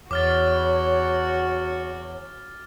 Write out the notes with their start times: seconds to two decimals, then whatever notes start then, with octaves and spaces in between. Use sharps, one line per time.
0.11 E2 F#4 C#5 D6 F6 A6